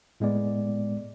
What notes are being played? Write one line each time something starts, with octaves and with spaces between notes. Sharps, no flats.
A2 G#3 B3 D5